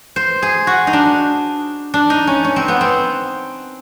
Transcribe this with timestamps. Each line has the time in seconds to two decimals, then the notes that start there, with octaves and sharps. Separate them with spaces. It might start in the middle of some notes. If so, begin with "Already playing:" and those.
0.16 C5
0.42 G#4
0.67 F#4
0.87 D#4
0.93 D4
1.94 D4
2.10 D#4
2.27 C#4
2.44 C#4
2.56 C4
2.68 B3
2.81 C4